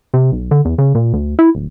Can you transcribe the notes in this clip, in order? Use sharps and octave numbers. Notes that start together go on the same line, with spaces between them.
C3
B1
D3
E2
C#3
A#2
D2
E4
D1